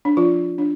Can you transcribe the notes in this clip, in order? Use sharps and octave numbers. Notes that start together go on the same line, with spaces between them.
D4
F3 F4
D4